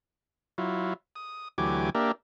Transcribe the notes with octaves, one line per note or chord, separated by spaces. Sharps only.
F#3 E4 F4
D#6
D2 E3 F#3 G4 G#5 D6
A#3 D4 G4 A#4 E5